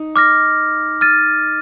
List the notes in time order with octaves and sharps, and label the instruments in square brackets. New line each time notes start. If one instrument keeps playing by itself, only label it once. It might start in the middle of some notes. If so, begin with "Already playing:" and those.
Already playing: [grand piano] D#4
[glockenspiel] D6 F6 A#6
F6 A6 D#7